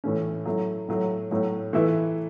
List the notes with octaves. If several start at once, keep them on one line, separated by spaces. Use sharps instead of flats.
A2 E3 A3 C#4
F#3 A3 E4
A2 F#3 A3
A2 F#3 A3
E3 A3 E4 B4